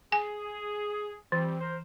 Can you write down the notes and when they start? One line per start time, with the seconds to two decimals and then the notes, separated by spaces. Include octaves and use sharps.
0.12 G#4 G#5
1.32 E3 G3 C4
1.61 A#4 C5